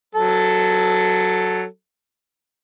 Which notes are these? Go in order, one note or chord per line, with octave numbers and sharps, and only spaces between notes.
F#3 A4